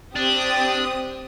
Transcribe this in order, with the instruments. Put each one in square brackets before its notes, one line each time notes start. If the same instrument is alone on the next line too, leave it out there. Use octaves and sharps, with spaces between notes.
[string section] C4 G4 D#6 [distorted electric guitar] D4